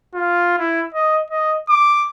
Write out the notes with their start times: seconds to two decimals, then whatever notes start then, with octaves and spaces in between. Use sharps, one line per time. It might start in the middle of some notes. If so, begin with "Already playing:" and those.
0.14 F4
0.59 E4
0.95 D#5
1.30 D#5
1.69 D6